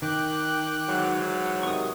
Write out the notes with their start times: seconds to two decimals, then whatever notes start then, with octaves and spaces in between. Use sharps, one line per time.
0.02 D#3 G5 D6 F#6
0.88 G#2 E3 F#3
1.63 C3 D#3 B3 C#6 D#6